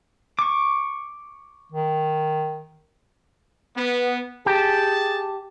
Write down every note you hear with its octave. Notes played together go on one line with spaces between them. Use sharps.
C#6 D6
D#3
B3
G4 G#4 A5